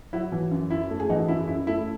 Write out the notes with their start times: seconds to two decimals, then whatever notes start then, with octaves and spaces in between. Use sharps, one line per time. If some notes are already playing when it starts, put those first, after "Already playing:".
0.13 F#3 E4
0.32 E3
0.51 F#2
0.71 F#2 E4
0.90 A3
1.00 G#4
1.09 E3 D#4 F#4
1.28 F#2 E4
1.48 F#2 E4
1.67 A3 E4